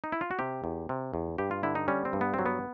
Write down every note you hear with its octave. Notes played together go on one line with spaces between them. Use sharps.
D#4
E4
F4
F#4
C3 G4
E2
C3
E2
G2 G4
F4
D3 E4
D#4
G3 C#4
C4
G2
B3
F#3 C4
B3